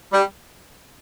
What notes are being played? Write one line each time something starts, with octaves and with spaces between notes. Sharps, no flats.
G3